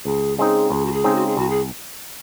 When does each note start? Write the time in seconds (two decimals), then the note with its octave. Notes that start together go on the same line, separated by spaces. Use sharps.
0.05 C#2 G#4
0.38 C#3 G#3 C4 D#4 G#4
0.71 C#2 G#4
0.85 F#4
0.93 G#4
1.04 C#3 G#3 C4 D#4
1.15 F#4
1.26 G#4
1.37 C2 F#4
1.50 G#4